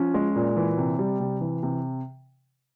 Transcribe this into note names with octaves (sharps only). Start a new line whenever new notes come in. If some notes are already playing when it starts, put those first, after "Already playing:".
Already playing: F3 C#4
G#3
A#2
E3
C3
G3
C3
E3
C3